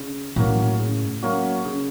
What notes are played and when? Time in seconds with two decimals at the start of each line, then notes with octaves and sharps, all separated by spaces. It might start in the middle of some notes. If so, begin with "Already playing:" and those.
Already playing: C#3
0.36 A2 F#3 A#3 C#4 F#4
0.80 C#3
1.22 F#3 A#3 C#4 F#4
1.65 C#3